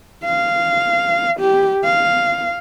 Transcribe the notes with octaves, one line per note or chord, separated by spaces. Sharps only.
F5
G4
F5